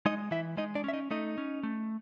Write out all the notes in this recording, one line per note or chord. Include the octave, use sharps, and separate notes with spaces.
G#3 D#4 D#5
E3 E4 E5
G#3 D#4 D#5
D4 D5
C#4 E5
D#4 D#5
A3 D#4 D#5
C#4
A3